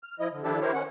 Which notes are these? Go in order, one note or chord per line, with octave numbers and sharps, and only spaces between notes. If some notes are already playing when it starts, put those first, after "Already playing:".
F6
F3 E4 D#5
D3
D#3 F3 D4 E4 G4 A4
E4 G4 A#4 C5 C#5
D#3 C#4 F#5